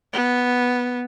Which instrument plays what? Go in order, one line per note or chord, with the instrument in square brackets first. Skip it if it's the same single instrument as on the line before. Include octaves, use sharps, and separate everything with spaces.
[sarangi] B3